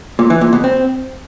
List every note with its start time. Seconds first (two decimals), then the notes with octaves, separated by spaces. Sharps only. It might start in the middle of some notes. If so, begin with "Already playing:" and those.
0.19 A#2
0.30 E3
0.41 A#2
0.53 B2
0.64 C4